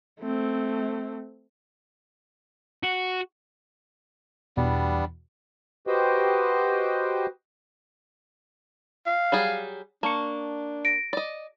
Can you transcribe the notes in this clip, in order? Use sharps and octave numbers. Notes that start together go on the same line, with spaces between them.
A3 C4
F#4
E2 B2 G3 B3 D4
F#4 G4 B4 C5 D#5 G5
F5
F#3 G3 G#4
A#3 D4 A5 C#6 C#7
A#6 D7
D5 D#5